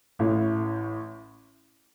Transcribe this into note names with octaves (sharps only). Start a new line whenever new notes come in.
A1 A2